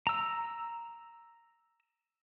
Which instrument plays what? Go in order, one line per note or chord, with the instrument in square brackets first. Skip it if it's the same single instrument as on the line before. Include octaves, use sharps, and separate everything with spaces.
[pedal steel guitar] A#5 E6